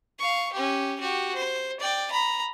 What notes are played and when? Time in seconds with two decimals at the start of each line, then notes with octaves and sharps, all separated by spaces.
0.19 F5 C#6
0.53 C#4 G4
1.00 F#4 G4
1.34 C5
1.80 D5 G5
2.11 A#5 B5